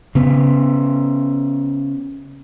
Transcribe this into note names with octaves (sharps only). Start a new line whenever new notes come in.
C#3 B3